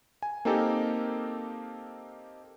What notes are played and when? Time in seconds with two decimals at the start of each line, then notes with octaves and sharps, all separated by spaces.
0.22 G#5
0.45 A#3 C4 D#4 G4 A4 A#4